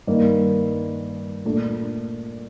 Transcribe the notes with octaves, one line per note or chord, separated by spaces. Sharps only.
G2 D#3 A#3
A#2 A3 D4